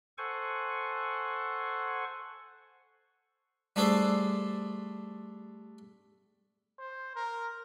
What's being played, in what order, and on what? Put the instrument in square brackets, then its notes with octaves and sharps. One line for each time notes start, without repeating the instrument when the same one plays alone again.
[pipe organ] A4 C5 F#5 G#5 C#6
[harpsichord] G3 A3 D4 G#4 A4 C5
[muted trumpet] C5
A#4